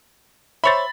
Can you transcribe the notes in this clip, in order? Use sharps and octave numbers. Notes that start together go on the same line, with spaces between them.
C5 C#5 E5 B5 A6